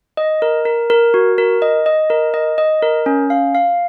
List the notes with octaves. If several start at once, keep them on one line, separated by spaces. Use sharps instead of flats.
D#5
A#4
A#4
A#4
F#4
A#4
D#5
D#5
A#4
D#5
D#5
A#4
C#4
F5
F5